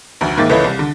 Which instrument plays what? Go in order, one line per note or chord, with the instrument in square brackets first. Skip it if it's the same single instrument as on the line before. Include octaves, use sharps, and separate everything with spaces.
[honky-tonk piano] F1 D2
G#2 D#3 A#3 E5 A6
C#2 E3 A4 B4 C#5 D#5
C2
D3